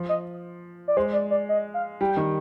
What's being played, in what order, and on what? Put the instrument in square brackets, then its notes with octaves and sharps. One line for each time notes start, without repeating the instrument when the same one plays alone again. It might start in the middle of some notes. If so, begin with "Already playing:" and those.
Already playing: [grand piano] F3
[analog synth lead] D#5
D5
[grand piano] G#3 [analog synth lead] C5
[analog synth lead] D5
D5
D#5
F5
[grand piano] G3 [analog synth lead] G5
[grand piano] D#3